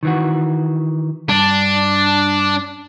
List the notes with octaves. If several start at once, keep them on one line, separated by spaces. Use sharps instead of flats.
D#3 E3 F#4
G2 D4